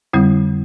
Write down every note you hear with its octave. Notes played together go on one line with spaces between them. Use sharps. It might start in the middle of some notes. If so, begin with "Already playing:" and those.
F2 D3 G3 C4 E4